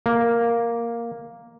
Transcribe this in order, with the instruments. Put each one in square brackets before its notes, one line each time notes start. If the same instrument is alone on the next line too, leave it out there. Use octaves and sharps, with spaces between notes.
[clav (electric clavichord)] A#3